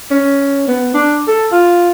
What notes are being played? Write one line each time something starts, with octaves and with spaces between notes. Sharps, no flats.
C#4
B3
D4
A4
F4